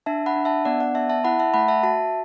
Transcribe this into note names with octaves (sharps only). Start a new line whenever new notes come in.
D4 E5 A5
F#5 B5
D4
E5 A5
B3 D5 F#5
D5 F#5
B3 E5 A5
E5 A5
E4 F#5 B5
E5 A5
A3 F#5 B5
E5 A5
F#4 E5 A5